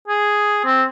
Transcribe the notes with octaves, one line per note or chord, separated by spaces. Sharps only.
G#4
C4